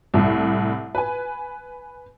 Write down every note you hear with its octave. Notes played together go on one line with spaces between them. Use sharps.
C2 A2
B4 G#5